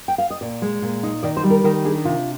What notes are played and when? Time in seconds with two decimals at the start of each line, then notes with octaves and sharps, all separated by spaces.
0.08 G5
0.18 F5
0.30 D#5
0.41 A#2 D5
0.62 G#3
0.82 A#2
1.03 D#4
1.23 D#3 D5
1.37 C5
1.44 G3
1.51 A#4
1.64 D#3 A#4
1.85 D4 G#4
2.05 C3 F4